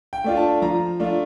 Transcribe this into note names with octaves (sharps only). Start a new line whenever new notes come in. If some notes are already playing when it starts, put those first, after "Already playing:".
G5
A3 D4 F4
A5
F3 A#5
A3 D4 F4